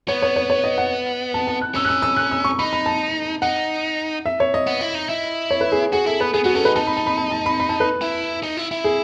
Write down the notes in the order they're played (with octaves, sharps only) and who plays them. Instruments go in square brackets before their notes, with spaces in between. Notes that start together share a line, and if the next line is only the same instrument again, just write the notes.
[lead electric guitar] B3 [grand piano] C#5
[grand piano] C#5
C#5
C#5
D#5
F#5
A5
A5
F#6
[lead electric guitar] C#4 [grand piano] E6
[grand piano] F#6
E6
E6
F#6
E6
C#6
[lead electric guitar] D#4 [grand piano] B5
[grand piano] B5
A5
[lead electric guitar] D#4 [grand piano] F#5
[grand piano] E5
C#5
D#5
[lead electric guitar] B3
E4
D#4
E4
[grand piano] C#5
B4
G#4
[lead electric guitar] F#4 [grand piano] G#4
[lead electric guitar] E4 [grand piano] A4
[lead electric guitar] B3 [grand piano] B4
[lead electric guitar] B3 [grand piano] G#4
[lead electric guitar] B3 [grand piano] F#4
[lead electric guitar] C#4 [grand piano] A4
[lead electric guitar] D#4 [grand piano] B4
[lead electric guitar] D#4 [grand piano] A5
[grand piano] B5
A5
B5
A5
A5
B5
B5
A5
B4
[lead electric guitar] E4
D#4
E4
E4
[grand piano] G#4